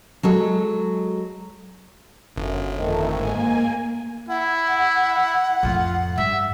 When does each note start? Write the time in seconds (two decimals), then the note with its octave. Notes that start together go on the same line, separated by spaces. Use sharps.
0.23 F#3 G#3 A4
2.36 G1 F#2
2.74 F2 D#3 A3
3.12 G#2 A#3 G#5
4.29 E4 F#5
5.63 F2 A2 F4
6.18 G2 E5